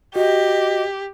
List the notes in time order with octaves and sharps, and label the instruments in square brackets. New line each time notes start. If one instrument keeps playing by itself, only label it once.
[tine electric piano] F#4 [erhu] G4 [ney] D#5